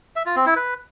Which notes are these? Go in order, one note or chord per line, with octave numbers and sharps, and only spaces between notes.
E5
F4
C4
E4
B4